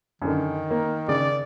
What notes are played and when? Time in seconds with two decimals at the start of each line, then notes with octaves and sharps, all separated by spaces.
0.22 F#2 D3 D#3
0.71 A#3
1.08 C#3 D5